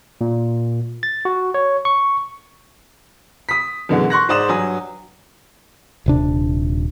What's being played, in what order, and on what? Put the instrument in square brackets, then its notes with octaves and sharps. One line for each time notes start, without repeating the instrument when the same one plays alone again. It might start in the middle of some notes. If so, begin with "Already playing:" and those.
[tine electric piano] A#2
A6
F#4
C#5
C#6
[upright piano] D#6 B6
F#2 B2 D3 E3 G#3
C6 C#6 F#6 A#6
G#2 C5 D5 D#6 E7
G2 F#3 G#5 D#6
[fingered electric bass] D#1 C3 D4